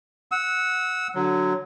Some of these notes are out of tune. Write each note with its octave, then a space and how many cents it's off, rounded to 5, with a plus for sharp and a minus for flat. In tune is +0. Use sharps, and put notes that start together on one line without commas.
F#5 -10 E6 -25
D3 +0 F#3 +0